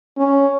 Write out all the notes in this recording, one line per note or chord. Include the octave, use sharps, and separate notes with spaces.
C#4